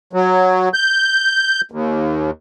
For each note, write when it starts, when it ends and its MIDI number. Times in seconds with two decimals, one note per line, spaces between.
0.13 0.69 54
0.74 1.61 91
1.72 2.30 39